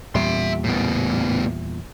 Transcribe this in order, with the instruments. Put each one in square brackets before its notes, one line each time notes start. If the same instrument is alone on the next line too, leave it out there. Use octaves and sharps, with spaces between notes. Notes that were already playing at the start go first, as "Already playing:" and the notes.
[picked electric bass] E2 A#2 G3 [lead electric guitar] E5 C6
[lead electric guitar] A2 B3